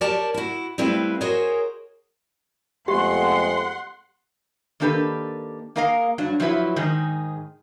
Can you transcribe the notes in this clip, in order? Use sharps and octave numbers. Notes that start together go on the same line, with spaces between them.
G4 A#4 C#5 D5 A5
E4 F#4
G3 A3 C4 E4 B4 F5
F#4 G#4 A#4 C5 C#5 D#5
F2 G#3 A3 B3 G4 F#5 C6
D#3 A#3 D4 G4 A4 B4
A#3 G#4 A#4 D#5 F5
G2 F#3 D4
F3 F#3 D4 E4 B4
G#2 D#3 D#4 G#4